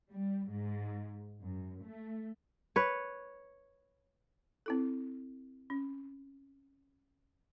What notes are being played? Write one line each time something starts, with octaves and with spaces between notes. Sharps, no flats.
G3
G#2
F#2
A3
B4 C#5
C4 E4 A4
C#4